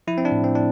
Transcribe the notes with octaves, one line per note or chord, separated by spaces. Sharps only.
F3 E4
C4
D4
A2
C4
A2 D4